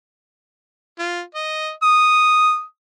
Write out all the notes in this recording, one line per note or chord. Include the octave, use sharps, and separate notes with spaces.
F4
D#5
D#6